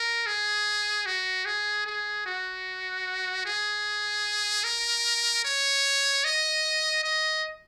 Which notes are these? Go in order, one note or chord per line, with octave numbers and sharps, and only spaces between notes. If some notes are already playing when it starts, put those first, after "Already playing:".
Already playing: A#4
G#4
F#4
G#4
G#4
F#4
G#4
A#4
C#5
D#5
D#5